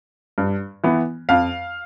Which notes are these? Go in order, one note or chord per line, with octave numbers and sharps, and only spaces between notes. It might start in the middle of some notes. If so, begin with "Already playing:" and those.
G2
E3 B3
F2 F5